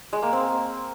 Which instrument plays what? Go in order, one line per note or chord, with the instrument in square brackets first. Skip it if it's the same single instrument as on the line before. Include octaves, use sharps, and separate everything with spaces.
[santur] G#3
A#3
C4